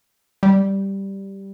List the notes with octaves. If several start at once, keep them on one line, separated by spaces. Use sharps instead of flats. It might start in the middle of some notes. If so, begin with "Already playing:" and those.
G3